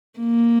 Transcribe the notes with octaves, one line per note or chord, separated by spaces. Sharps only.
A#3